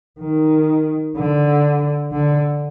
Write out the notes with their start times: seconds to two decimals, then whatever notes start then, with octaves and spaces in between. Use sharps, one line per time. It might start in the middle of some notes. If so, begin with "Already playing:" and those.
0.20 D#3
1.16 D3
2.12 D3